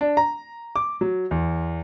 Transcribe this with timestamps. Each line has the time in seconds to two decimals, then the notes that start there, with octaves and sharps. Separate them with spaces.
0.01 D4
0.17 A#5
0.76 D6
1.01 F#3
1.31 E2